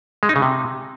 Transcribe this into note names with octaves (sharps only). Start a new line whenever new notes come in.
G#3
D#4
C#3
C3